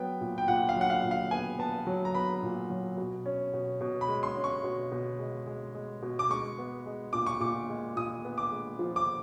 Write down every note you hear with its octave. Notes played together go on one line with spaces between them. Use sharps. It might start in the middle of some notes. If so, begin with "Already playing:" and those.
Already playing: F#3 B3 G5
A#2
G5
A#2 F#5
F5
F#3
F#5
F5
A#2
F5
B3 G#5
B3 A5
F#3
A#5
B3 B5
A#2
F#3
B2
C#4
B2
B2
B5
G#3
C6
C#4
C#6
B2
B2
G#3
G#3
G#3
B2
D6
G#3 C#6
B3
G#3
A#2 D6
C#6
A#2 D6
G#3
A#2 D#6
B3
D6
G#3
F3
D6